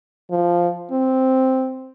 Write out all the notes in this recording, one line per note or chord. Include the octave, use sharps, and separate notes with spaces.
F3
C4